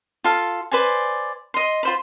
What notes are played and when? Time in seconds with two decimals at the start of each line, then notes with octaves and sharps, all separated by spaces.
0.24 F4 A4 F5
0.71 B4 C5 D5 G#5
1.54 D#5 C6
1.83 F4 C5 B5